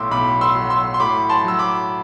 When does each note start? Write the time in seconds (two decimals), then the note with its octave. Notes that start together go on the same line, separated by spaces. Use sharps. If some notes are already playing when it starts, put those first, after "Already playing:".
Already playing: B1 A2 C6 D6 E6
0.11 B1 B5 D6
0.41 C6 E6
0.55 F#3
0.70 C6 E6
0.94 C6
1.00 A2 B5 D6
1.29 A5 C6
1.45 F#3 E6
1.59 B5 D6